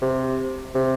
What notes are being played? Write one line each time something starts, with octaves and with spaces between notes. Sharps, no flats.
C3
C3